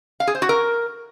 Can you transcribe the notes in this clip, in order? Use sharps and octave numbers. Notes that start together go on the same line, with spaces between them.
F5
G#4
C5
F#4
A#4